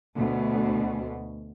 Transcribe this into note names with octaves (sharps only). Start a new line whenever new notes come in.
D2 B2